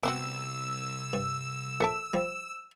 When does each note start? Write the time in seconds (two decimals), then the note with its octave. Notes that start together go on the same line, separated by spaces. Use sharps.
0.03 C2 B3 C4 F#4 D6 E6
1.13 G2
1.80 A#1 A4 E5 A5 D6
2.14 F3 G3